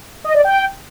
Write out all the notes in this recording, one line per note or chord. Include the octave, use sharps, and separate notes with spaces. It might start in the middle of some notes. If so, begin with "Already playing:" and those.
D#5
D5
G5